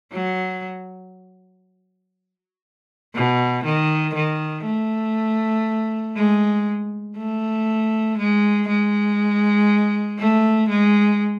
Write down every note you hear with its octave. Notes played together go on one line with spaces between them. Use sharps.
F#3
B2
D#3
D#3
A3
G#3
A3
G#3
G#3
A3
G#3